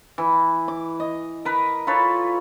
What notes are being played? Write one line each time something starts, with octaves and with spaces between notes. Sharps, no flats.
E3
D6
D#5
A#4 B4
F4 A4 B4 C#5